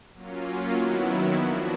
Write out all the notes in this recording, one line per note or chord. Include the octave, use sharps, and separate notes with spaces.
F#3 A#3 C#4 F4
D#3 F#3 B3 E4
F3 A#3 D4 F#4